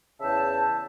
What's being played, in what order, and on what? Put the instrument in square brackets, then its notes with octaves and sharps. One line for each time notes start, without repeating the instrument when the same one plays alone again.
[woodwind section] E2 C#3 E5 G5 A5